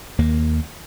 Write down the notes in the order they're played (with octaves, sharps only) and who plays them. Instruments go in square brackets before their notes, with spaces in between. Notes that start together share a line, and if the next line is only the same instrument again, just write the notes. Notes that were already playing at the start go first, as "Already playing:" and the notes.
[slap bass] D#2 A#3